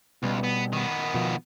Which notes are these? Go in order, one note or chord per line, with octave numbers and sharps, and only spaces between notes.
C#2 B2 G3
B3
D#3 B3
B2 F3